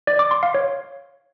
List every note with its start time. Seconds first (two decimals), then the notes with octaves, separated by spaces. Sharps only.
0.07 D5
0.19 D6
0.31 C6
0.43 F5
0.54 C#5